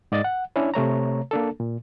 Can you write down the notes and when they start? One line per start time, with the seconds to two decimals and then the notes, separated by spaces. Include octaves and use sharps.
0.12 G#2 D5 D#5 A6
0.24 F#5
0.56 C#4 D4 E4 C#5
0.74 C3 A3 C#5 A#5
1.31 A#3 D4 A4
1.60 A#2